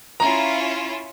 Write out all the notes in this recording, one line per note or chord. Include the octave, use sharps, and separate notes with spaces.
C#4 E4 F4 A#5